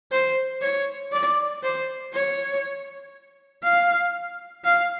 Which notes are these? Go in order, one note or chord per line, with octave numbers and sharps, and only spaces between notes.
C5
C#5
D5
C5
C#5
F5
F5